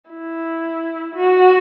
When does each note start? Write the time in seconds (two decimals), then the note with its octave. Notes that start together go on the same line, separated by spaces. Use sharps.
0.10 E4
1.15 F#4